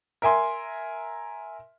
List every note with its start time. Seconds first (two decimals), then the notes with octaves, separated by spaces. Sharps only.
0.22 A#4 E5 G#5 C6